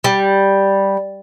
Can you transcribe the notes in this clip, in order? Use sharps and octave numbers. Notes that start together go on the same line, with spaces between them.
G3